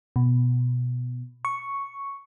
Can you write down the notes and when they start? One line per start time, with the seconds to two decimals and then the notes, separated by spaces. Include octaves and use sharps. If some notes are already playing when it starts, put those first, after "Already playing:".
0.16 B2
1.45 C#6